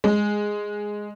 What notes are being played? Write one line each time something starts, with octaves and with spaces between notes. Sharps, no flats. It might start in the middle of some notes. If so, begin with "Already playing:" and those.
G#3